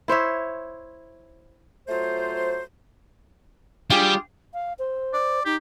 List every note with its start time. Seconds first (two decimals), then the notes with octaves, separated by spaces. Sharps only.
0.08 E4 C5 C#5 E5
1.88 F#3 A3 F4 C5
3.90 G3 F4 G4 G#4
4.54 F5
4.79 C5
5.13 D5
5.45 D#4 G4